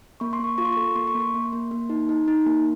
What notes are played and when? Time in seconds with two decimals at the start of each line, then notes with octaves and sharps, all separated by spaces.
0.20 A#3 C#6
0.33 C6
0.39 A#3 C#6
0.58 F4 C#6
0.65 C6
0.73 A4 C#6
0.96 A#3 C6
1.07 C#6
1.15 A#3
1.20 C6
1.34 A#3
1.53 A#3
1.71 A#3
1.90 D#4
2.09 D#4
2.28 D#4
2.46 A#3